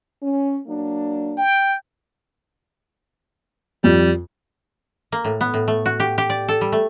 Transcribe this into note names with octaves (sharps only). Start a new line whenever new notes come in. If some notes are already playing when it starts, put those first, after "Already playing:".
C#4
F#3 A#3 D4
G5
F2 G3
A#3
A2
B3
A2
A3
F#4
G4
G4
D5
A4
G3
A3